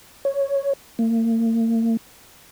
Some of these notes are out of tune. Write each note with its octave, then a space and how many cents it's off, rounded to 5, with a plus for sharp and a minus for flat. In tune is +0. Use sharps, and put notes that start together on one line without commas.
C#5 +0
A#3 -40